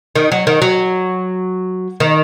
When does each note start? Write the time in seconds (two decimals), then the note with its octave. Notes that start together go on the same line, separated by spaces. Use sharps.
0.15 D#3
0.32 F#3
0.47 D#3
0.62 F#3
2.00 D#3